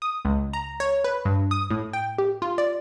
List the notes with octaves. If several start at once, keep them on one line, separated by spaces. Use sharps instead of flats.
D#6
C#2
A#5
C#5
B4
G2
D#6
A2
G5
G4
F4
D5